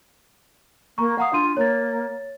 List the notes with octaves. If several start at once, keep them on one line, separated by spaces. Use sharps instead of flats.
A#3 A#5 C#6
F5 F#5 A#5 D#6
D4 F4 C6 D#7
A#3 C#5 A6